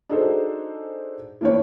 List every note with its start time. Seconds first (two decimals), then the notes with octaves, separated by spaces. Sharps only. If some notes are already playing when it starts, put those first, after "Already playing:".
0.09 D4 D#4 F#4 G#4 A4 C5
1.41 E3 A#3 D4 E4 C#5